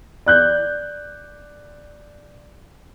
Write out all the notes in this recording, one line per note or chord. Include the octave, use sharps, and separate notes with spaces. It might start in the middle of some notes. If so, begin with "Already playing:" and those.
D5 F#6 G6